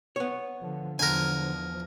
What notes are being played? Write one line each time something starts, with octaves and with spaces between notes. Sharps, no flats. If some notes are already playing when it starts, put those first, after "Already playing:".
B3 C#5
D3 F3
E2 D3 F3 A#4 G#5